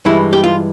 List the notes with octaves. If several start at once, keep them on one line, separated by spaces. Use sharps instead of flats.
G2 E3 G#3 E4
G4
F4